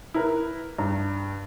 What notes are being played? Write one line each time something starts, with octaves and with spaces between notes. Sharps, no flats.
E4 A#4 B4
G2